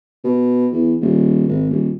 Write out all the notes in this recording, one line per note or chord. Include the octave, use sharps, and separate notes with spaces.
B2
E2
D#1
G#1
D#1